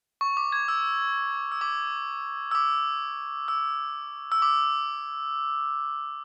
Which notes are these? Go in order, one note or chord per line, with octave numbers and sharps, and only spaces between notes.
C#6
D6
G#6
E6
E6
D6
E6
D6
E6
E6
D6